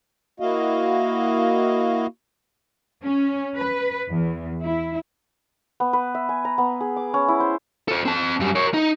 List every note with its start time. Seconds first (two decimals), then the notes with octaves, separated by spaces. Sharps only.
0.40 A#3 E4 F#4 D#5 F5
3.03 C#4
3.56 B4
4.08 E2
4.63 E4
5.80 B3
5.93 B4
6.15 E5
6.29 G#5
6.45 A#5
6.58 B3
6.81 G#4
6.96 D6
7.14 C#4
7.28 E4
7.40 C5
7.88 A4 C5
8.05 C4 A5
8.40 F#2 G3
8.55 A#4 C#5
8.74 D#4